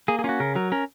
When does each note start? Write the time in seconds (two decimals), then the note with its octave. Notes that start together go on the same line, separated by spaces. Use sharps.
0.08 A#3 G#4
0.19 G#4
0.24 C#4 F4
0.29 F#4
0.40 C#3 A#4
0.56 F#3 A#4
0.72 C#4 A#4